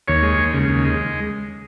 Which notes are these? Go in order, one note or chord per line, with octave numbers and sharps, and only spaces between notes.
D#2 C#5
G#3
D#2
C#3
D#2
G#3